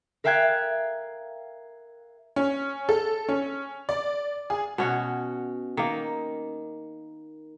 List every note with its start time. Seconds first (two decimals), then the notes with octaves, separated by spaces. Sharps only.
0.24 A#4 E5 F5 G5 F#6 G#6
2.36 C#4
2.89 A4
3.29 C#4
3.89 D5
4.50 G#4
4.78 B2 C#4 F#4
5.77 D#3 A#3